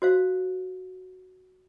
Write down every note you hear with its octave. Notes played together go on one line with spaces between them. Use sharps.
F#4 C5 F5